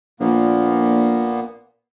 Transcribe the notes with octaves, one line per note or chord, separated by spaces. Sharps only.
A#1 A#2 A#3 B3